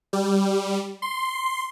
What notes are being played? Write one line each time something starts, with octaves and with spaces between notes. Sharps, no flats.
G3
C6